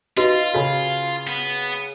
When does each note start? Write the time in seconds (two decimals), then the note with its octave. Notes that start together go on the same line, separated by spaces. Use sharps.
0.17 D#4 F4 F#4 B4
0.54 C#3 G#4 B5
1.27 B3